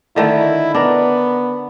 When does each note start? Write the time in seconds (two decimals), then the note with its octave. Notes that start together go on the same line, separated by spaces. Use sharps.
0.16 D3 D#3 A3 E4
0.74 B3 D4 A#4